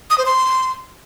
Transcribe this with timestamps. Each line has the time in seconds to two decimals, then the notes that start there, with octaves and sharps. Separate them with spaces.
0.10 D#6
0.18 C5
0.26 C6